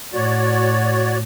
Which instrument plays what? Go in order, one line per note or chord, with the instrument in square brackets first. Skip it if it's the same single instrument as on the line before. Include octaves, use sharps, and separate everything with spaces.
[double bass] A2 [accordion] F#4 C#5 D5